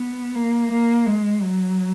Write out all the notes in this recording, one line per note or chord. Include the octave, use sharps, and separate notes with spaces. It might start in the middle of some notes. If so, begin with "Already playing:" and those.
Already playing: B3
A#3
A#3
G#3
F#3